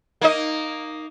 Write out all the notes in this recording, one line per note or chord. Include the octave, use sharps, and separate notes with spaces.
A#3 D#4 D#5